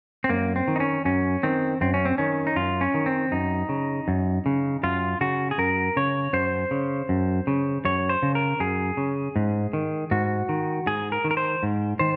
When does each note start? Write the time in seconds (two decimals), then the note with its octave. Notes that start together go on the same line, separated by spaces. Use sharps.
0.24 C4
0.29 F#2 A#3
0.56 C4
0.68 D#3
0.76 D#4
0.80 C#4
1.05 F#2 C#4
1.43 D#3 C4
1.81 F#2 C4
1.94 C#4
2.05 C4
2.18 D#3 C#4
2.47 D#4
2.56 F#2 F4
2.81 C#4
2.94 D#3
3.06 C4
3.32 F#2 D#4
3.69 C#3
4.08 F#2
4.46 C#3
4.83 F#2 F4
5.21 C#3 F#4
5.51 G#4
5.58 F#2 A#4
5.97 C#3 C#5
6.33 F#2 C5
6.71 C#3
7.09 F#2
7.47 C#3
7.85 F#2 C#5
8.09 C5
8.23 C#3
8.35 A#4
8.60 F#2 G#4
8.97 C#3
9.36 G#2
9.73 D#3
10.11 G#2 F#4
10.49 D#3
10.86 G#2 G#4
11.12 A#4
11.24 D#3
11.31 A#4
11.37 C5
11.63 G#2
11.99 D#3 C5